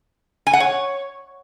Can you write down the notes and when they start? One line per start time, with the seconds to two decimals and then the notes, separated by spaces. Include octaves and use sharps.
0.47 G#5
0.53 F#5
0.60 C#5